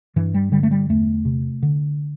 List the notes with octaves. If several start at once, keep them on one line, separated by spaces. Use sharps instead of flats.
G2 E3
G3
D3 G3
A3
G3
E2 A3
C3
D3